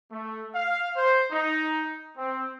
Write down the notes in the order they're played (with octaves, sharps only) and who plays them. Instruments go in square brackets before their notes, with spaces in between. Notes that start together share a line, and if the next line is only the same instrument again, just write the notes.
[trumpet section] A3
F5
C5
D#4
C4